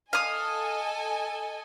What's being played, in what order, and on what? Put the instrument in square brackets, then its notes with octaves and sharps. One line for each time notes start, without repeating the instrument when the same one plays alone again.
[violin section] A4 D#5 G#5 [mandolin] F5 D#6